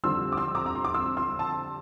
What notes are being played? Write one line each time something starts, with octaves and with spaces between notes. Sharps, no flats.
F2 D3 G3 C4 C6 E6
D6
C6 E6
A#5 D6
A#5
C6
D6
C6 E6
C6 E6
A5 C6